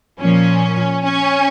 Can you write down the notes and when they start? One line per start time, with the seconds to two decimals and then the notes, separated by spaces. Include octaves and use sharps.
0.19 A#2 F3 C#4
1.04 C#4